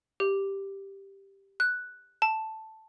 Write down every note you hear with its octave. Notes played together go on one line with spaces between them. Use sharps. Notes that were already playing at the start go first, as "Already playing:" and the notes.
G4
F#6
A5